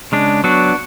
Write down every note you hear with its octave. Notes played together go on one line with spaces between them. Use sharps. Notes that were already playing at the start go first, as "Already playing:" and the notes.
C#3 G#3 D4
F#3 B3 D4 F#4